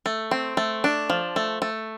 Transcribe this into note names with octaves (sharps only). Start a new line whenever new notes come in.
A3
C4
A3
D4
F3
A3
A3